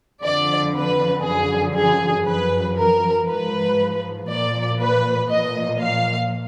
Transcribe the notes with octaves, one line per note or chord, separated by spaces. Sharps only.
F2 D3 F3 D5
B4
F#2 D3 F3 G#4
G#4
F#2 F3 B4
A#4
G#2 F3 B4
A#2 F3 D5
B4
A#2 F3 D#5
F5